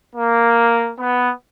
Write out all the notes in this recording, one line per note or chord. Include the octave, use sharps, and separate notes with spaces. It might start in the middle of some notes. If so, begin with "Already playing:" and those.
A#3
B3